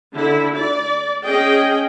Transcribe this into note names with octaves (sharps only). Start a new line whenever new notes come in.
D3 E4
D5
C#4 G#4 D#5 G5